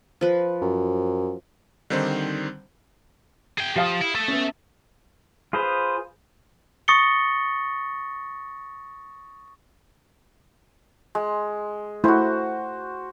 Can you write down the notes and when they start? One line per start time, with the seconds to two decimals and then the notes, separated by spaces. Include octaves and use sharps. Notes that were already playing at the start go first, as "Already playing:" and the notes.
0.21 F3 B4
0.61 F#2
1.90 D3 D#3 G3 C4 D#4 C5
3.58 G#4 G5
3.76 F3 G4 F5 D#6
4.01 E4
4.15 A4 E5
4.28 B3 C#4
5.53 F4 G#4 B4 C5
6.88 C#6 D#6 A6 A#6 C#7 G7
11.15 G#3
12.04 A3 E4 F#4 C5